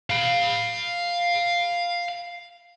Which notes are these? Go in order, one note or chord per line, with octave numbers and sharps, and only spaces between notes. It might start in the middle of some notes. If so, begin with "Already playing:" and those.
F5 B5